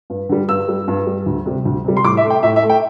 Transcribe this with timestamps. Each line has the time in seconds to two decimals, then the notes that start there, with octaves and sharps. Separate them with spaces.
0.10 G2
0.29 D3 G3
0.49 G2 E6
0.68 G3
0.88 G2
1.07 G3
1.26 D2
1.46 C3 G3
1.65 D2
1.84 C3 G3
1.97 C6
2.04 A2 D6
2.17 E5
2.24 A3
2.30 G5
2.43 A2 E5
2.56 E5
2.63 A3
2.70 G5